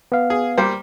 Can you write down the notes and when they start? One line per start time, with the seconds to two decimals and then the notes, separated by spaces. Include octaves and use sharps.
0.12 B3 F5
0.30 G#4
0.58 G3 A#3 C5